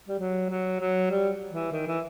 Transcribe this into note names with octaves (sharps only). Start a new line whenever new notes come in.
G3
F#3
F#3
F#3
G3
E3
D#3
E3